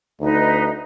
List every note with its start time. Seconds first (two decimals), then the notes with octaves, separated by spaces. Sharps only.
0.20 D2 D#4 B4